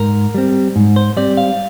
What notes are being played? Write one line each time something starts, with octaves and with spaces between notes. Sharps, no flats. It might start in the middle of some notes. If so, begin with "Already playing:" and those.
Already playing: G#2 A#4
G3 C4
G#2
C5
G3 C4 D5
F5